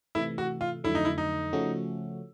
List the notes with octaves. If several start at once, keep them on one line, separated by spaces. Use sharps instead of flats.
C3 E3 A3 E4
F#4
F4
F2 D3 F#3 A3 E4
D#4
E4
D#4
C#3 F3 A3 C#4 F#4